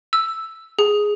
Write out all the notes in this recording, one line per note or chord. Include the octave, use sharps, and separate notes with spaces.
E6
G#4